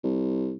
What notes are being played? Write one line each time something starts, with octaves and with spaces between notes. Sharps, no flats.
C2